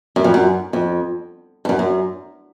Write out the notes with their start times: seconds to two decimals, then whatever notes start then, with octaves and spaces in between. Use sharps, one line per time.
0.16 F#2
0.24 F2
0.34 F#2
0.73 F2
1.65 G2
1.69 F#2
1.79 F#2